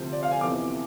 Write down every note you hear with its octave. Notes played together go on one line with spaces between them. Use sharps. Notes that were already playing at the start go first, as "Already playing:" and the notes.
Already playing: D2 C3 F3 C5
D5
F5
G#5
F2 C3 E3 B3 D6